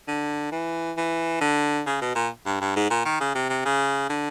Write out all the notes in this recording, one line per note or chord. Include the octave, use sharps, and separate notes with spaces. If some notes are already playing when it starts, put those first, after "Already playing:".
D3
E3
E3
D3
C#3
B2
A#2
G2
G2
G#2
A#2
D#3
C#3
C3
C3
C#3
D3